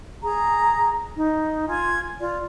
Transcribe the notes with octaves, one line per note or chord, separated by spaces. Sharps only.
G#4 A#5
D#4
F4 G#5 G#6
F4 D5